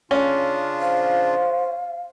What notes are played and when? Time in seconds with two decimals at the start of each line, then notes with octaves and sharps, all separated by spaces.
0.11 C#3 C#4 D4 F4
0.80 C5 F5